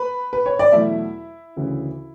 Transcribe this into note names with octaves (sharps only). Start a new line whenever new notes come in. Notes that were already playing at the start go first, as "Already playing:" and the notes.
Already playing: B4 B5
B4
C#5
D5
E2 B2 F#3 A3 E4 E5
D2 C#3 E3